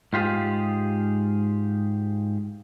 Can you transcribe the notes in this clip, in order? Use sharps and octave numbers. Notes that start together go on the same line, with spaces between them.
G#2 F4 G4 G#4